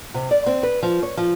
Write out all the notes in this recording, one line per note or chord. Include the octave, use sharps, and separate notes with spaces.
C3
D5
C4
B4
F3
C#5
F3